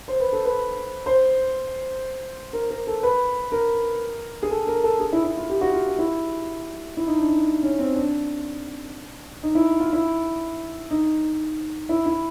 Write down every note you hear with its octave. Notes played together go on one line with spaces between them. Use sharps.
C5
B4
A4
B4
C5
A#4
A#4
A4
B4
A#4
G#4
A4
A#4
A4
G#4
E4
E4
F4
G4
F#4
F4
F4
E4
E4
D#4
D4
D#4
C#4
C4
D4
D#4
E4
F4
E4
D#4
E4
E4